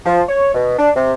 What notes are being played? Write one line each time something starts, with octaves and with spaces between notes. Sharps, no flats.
F3
C#5
B2
D4
C3